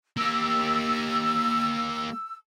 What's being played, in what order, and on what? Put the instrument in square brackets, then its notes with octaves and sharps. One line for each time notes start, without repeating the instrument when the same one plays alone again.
[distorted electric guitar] A#3 G4 [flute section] E6